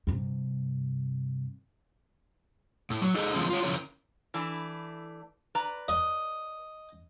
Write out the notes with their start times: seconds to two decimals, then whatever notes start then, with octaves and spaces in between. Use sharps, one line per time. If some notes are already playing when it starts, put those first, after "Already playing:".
0.07 G2 C3
2.90 A2
3.01 F#3
3.15 D#4 G#4 A4 D#5
3.33 D3 D#3 F3 G#3 B3 C#4
3.50 F4 C#5
3.63 C#3 F3 C#4 E4 A#4 C#5
4.34 E3 A3 D4
5.55 B4 D5 A#5
5.88 D#5